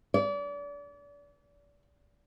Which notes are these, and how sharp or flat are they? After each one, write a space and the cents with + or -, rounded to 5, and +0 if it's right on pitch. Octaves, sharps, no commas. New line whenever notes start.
D5 -35